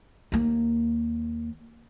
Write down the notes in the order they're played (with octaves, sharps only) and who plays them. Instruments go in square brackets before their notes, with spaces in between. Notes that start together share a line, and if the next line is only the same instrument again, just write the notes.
[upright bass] D#2 A#3